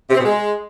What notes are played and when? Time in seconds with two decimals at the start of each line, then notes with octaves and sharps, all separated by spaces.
0.10 C3
0.15 C4
0.20 B2
0.25 G#3